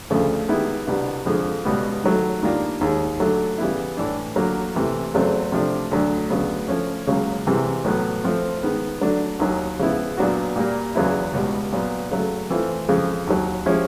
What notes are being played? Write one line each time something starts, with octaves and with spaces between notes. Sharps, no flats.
D2 C#3 F3 A3
D#3 G#3 B3 E4 G4
C2 B2 G3 B3 D4
F2 D3 F3 G#3
C#2 B2 G3 B3
D#3 F#3 A3
D#3 G3 A#3 D4 F4
D#2 D#3 G#3
D3 F#3 A3
C#3 E3 G3 B3 E4
A2 E3 A3 D4
D3 F#3 A#3
C3 E3 A3
E2 C#3 F#3 A3 C4
C3 F3 A3 D4
D2 D3 F#3 A3 D4
D2 C#3 F#3 B3
F3 A3 C#4
C#2 C#3 F#3 A#3
C2 C3 E3 G#3
A2 F#3 B3
F3 A3 C4
D#3 G#3 B3
D3 F#3 A3 D4
D#2 D#3 F#3
C#3 F3 G#3 B3 E4
A#2 F#3 B3 D4 F#4
A#2 G3 A#3
E2 C#3 F#3 B3 E4
C#2 B2 G3
A#2 F#3 B3
C#3 F#3 A3
E3 A3 C4 F4
F2 C#3 F3 G#3
D#2 D#3 F#3
F3 G#3 C#4 E4 G4